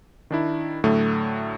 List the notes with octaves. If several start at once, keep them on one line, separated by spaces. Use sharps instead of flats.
D#3 D4 E4
A2 D3 F#3 A3